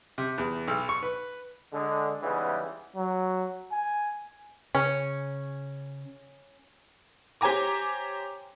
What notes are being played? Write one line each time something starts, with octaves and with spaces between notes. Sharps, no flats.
C3
E2
B1
C#6
B4
D3 G#3
G#2 C#3 E3 G3 G#3 B3
F#3
G#5
C#3 C#4
G4 C5 C#5 G#5 A#5 D6